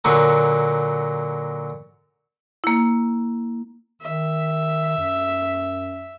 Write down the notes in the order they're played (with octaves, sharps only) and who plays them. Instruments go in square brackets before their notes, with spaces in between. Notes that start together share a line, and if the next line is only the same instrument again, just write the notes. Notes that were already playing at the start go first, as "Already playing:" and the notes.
[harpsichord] A#2 D3 F#3 A#3
[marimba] A#3 E4
[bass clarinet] D#3 [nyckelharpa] E5
[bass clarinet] F#2